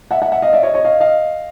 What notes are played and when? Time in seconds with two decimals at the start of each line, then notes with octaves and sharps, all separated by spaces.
0.11 E5 F#5
0.22 E5 F#5
0.32 E5 F#5
0.42 D#5 F5
0.53 D5 E5
0.63 C#5 D#5
0.74 C#5 D#5
0.84 D#5 F5
1.00 D#5 F5